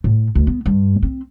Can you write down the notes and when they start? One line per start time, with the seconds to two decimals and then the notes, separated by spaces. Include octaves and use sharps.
0.04 A2
0.35 D2
0.47 B3
0.66 G2
1.03 C4